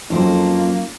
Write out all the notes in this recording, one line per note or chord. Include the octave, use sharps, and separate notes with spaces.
F2 F#3 A#3 C#4 D#4 F4 C5